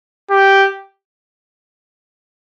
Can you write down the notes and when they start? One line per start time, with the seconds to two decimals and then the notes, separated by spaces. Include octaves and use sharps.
0.31 G4